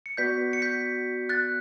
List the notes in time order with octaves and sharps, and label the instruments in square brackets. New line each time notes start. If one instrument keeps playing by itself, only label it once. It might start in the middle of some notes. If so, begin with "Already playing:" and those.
[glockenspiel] C#7
[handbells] B3 F#4 B4 D5 [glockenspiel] G6 B6
[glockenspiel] C#7
G6 B6
F#6 A6